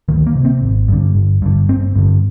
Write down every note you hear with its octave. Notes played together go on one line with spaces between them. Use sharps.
D2 D#3
A#3
C3
C4
G#1
G2 D3
G1
G2 D3
G1 C4
G2 D3